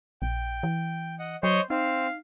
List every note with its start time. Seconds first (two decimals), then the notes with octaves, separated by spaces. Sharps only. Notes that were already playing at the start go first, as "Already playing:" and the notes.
0.22 A#1 G5
0.63 E3
1.19 D#5 F#5
1.43 F#3 C5 C#5 D#5 C#6
1.70 C4 D#4 F5